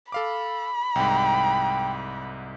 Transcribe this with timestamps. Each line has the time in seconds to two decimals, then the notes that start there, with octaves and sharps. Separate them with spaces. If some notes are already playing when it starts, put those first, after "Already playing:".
0.12 A4 F5 B5 D6
0.95 C2 G#2 G5